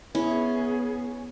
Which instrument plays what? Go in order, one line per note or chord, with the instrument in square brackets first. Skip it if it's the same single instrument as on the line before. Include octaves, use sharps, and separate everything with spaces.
[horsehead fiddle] B3 [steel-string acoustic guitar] C#4 [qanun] E4 [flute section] G#4